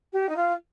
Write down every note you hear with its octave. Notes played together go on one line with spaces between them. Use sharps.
G4
D#4
F4